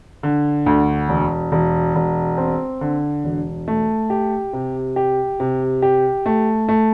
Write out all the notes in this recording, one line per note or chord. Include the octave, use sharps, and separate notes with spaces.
D3
D2
E1
E1
E1
C4
D3
E1
A3
G4
C3
G4
C3
G4
A3
A3